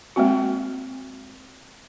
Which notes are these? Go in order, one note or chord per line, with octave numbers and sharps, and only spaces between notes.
G#3 A#3 C4 F#4